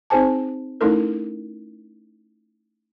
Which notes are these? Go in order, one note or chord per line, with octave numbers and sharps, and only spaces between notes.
C4 D#4 G#4 C5 G#5 A5
A3 C#4 D#4 E4 A4 A#4